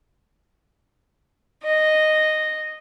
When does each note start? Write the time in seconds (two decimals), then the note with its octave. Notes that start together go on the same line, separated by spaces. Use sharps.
1.63 D#5